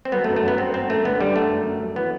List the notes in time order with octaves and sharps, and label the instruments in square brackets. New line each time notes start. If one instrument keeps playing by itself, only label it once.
[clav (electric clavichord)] C4
[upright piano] F#3 [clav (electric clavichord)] B3
[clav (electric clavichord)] A3
[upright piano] F#2
[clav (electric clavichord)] A3
[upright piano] F#2 [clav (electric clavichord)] B3
[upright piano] F#2 [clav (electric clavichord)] C4
[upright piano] F#2 [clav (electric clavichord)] C4
[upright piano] F#2 [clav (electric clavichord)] A3
[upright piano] D3 [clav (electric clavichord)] B3
[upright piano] D3 [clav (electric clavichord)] G3
[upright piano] F#2 [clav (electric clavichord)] A3
[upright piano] F#2
F#2
F#3
[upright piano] E3 [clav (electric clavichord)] B3